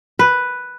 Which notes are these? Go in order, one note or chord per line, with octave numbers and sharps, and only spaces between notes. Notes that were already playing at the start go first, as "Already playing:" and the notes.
B4